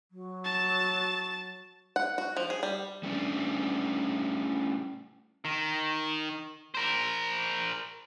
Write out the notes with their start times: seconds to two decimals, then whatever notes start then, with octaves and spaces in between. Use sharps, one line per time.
0.11 F#3
0.44 A5
1.96 F#5
2.18 F#4
2.37 F3
2.50 G#4
2.63 G3
3.03 G3 A3 C#4 D4
5.45 D#3
6.75 A#4 C5